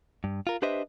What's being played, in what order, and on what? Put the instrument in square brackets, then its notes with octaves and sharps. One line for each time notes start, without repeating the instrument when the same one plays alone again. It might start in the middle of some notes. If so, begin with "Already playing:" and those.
[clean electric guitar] G2
F4 A#4
D4 G4 B4 C5 D#5 E5